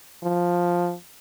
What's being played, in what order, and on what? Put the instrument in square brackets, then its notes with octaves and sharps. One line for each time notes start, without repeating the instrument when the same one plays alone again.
[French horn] F3